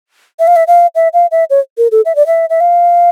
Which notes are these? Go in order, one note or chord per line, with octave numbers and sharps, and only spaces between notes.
E5
F5
E5
F5
E5
F5
E5
C#5
A#4
A4
E5
D5
E5
E5
F5